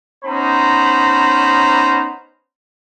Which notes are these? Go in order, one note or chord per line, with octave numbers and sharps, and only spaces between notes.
B3 C#4 D#4 C5 A#5 B5